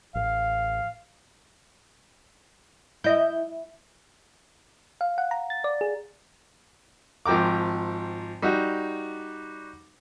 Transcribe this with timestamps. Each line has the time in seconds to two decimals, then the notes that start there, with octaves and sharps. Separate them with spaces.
0.15 A1 F5
3.04 E4 D#5 G6
5.01 F5
5.18 F#5
5.31 A#5
5.50 A6
5.64 D5
5.81 G#4
7.26 G#1 F3 G5 A#5 D6
8.42 G3 D#4 F#4